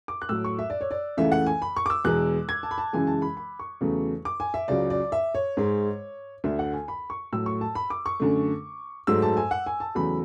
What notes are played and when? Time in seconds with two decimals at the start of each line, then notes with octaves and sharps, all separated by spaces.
0.08 D6
0.22 F#6
0.29 A2 F#3 A3 E6
0.44 C#6
0.59 E5
0.70 D5
0.81 C#5
0.91 D5
1.17 C#2 C#3 E3 A3 E5
1.32 F#5
1.46 G#5
1.62 B5
1.77 C#6
1.86 D6
1.90 E6
2.05 E2 B2 G#3 F#6
2.49 G#6
2.63 A5
2.71 B5
2.78 A5
2.93 F#2 C#3 E3 G#3 G#5
3.07 A5
3.22 B5
3.37 B5
3.59 C#6
3.81 E2 C#3 F#3 A3
4.25 D6
4.40 G#5
4.54 E5
4.68 C#2 C#3 F#3 D5
4.90 D5
5.12 E5
5.35 C#5
5.57 G#2 G#3
6.44 D2 D3 A3 E5
6.59 F#5
6.73 G#5
6.88 B5
7.10 C#6
7.33 A2 F#3 A3 E6
7.46 C#6
7.61 A5
7.75 B5
7.90 D6
8.06 C#6
8.20 F#2 D3 A3
9.07 G#2 F#3 A3 E6
9.22 A5
9.37 G#5
9.51 F#5
9.66 G#5
9.80 A5
9.95 E2 C#3 F#3 A3 B5